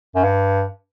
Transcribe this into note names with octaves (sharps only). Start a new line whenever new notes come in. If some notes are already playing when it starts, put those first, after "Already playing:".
F#2
G2